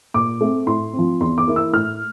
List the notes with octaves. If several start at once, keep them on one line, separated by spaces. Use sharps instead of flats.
A#2 D6
A3 C4
A2 C6
C4
F3
E2 C6
D6
E3 A#3 E4
E6
A2 F6